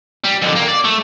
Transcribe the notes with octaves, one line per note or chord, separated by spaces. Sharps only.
G3
F2 D3
A#3
D5
A3